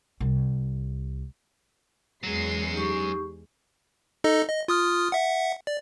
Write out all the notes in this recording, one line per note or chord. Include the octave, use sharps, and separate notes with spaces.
C2
E2 F#3 G#3 C#4 C7
D#4 G4 C#6
D#4 A4 D#5
D#5
F4 D#6 F6
E5 F#5
D5